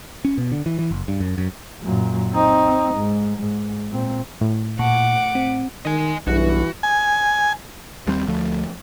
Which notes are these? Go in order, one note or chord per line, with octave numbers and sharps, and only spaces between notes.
C#4
B2
D3
E3
E3
F#1
G2
F#2
F#2
F#2 A#2
C4 D#4
G#2
G#2
A#2 C4
A2
A#2 F#5 D6
C4
D#3 D#5 G#5
B1 G2 E3 F#4
G#5
D#2 G3 A#3 C4
D2 F3 A3